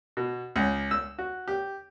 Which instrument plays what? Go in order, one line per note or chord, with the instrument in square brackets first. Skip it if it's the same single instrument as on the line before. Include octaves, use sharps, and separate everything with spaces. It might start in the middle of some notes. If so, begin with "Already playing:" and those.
[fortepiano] B2
C#2
E6
F#4
G4